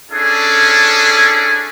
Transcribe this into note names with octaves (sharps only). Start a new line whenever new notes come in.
C#4 D4 E4 G#4 A4